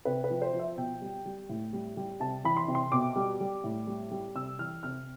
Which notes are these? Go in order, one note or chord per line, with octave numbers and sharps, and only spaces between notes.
C3 B4
B4
F3
C5
F3
E5
B2 G5
G3
G3
A2
G3
G3
C3 A5
E3 B5
C6
C3
C6
B2 D6
G3
G3
A2
G3
G3
C3 E6
E3 F6
C3 F6